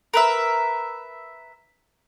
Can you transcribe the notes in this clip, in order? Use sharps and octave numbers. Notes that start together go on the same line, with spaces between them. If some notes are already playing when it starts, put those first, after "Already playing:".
A#4 B4 E5